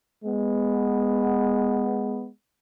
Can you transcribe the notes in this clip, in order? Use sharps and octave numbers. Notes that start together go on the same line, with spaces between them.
G#3 B3